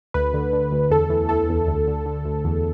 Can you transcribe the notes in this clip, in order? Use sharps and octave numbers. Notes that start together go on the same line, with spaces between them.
D2 B4
D3
D3
D2
E2 A4
E3
E3 A4
E2
D2
D3
D3
D2
E2